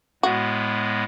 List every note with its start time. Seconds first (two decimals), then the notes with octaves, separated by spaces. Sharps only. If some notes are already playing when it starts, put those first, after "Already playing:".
0.23 A2 G#3 B3 F#4